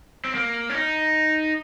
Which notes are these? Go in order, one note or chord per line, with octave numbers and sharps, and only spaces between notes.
C4
A#3
C#4
D#4